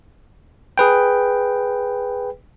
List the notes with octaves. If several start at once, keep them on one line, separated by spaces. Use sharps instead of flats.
G#4 B4 G5